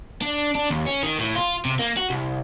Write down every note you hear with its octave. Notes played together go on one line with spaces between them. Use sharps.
D4
D4
D#2
C#4
D#3
A2
F4
C3
A#3
F#4
C2